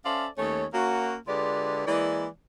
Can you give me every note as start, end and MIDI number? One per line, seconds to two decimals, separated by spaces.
0.05 0.26 61
0.05 0.26 69
0.05 0.26 72
0.05 0.26 74
0.05 0.26 76
0.05 0.26 77
0.38 0.65 39
0.38 0.65 57
0.38 0.65 61
0.38 0.65 73
0.73 1.15 58
0.73 1.15 61
0.73 1.15 66
1.28 1.85 50
1.28 1.85 56
1.28 1.85 65
1.28 1.85 67
1.28 1.85 71
1.28 1.85 74
1.86 2.26 52
1.86 2.26 56
1.86 2.26 58
1.86 2.26 64
1.86 2.26 74